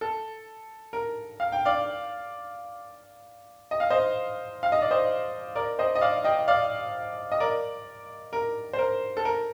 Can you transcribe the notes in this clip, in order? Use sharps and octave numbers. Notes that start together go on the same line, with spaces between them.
A4
A#4
F5
G5
D5 F5
D#5
F5
C5 D#5
F5
D#5
D5
C5 D#5
A#4 D5
C5 D#5
D#5
D5 F5
D#5 G5
D5 F5
D#5
A#4 D5
A#4
C5
A#4
A4
A#4